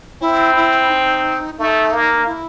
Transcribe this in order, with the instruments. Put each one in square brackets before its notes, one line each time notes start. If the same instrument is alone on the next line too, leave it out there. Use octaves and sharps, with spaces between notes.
[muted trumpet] C4 [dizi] E4
[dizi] E4
D#4
[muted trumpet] A3 [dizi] D#4
[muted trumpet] A#3
[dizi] E4